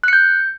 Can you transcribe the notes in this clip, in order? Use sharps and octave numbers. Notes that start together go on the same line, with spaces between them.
F#6 G6 C#7